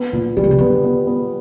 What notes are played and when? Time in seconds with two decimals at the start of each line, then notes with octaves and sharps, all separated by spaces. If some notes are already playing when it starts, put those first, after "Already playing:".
Already playing: B3
0.12 A#2 D3
0.37 D#3 G3
0.44 D3
0.51 C#3
0.58 D3 B3
0.84 B3
1.07 B3